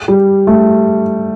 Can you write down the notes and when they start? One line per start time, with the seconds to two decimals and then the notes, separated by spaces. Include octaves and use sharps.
0.08 G3
0.47 A3